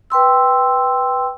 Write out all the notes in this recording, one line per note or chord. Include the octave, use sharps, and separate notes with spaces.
B4 G5 C6 E6